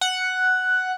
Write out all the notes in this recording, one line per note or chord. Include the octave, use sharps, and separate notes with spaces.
F#5